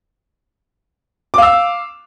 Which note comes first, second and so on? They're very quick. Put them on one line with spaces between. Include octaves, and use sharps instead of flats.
D6 F5 E6